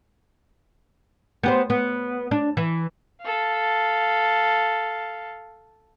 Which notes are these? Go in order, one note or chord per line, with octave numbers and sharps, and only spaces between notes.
B3 G4 C5
B3
D4
E3
A4 F5